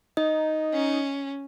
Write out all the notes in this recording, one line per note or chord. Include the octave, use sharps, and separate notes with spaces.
D#4 D#5
C#4